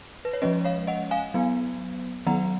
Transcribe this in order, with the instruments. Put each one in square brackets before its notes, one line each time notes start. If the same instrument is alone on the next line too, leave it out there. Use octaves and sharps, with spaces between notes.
[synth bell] B4
C#5
F3 G#3 C#4 B4 D#5
C#5 F5
D#5 F#5
F5 G#5
F#3 B3
D#3 F#3 B3 F#5 A#5